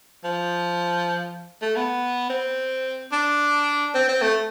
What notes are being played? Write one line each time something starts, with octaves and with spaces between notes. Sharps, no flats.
F3
A3
B3
C4
D4
C4
C4
A3